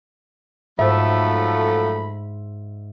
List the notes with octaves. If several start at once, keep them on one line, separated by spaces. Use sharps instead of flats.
G#2 F3 F#3 A3 E5 B5